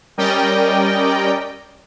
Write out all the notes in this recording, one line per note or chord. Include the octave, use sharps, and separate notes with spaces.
G3 C#4 A#4 D5 D#5 G5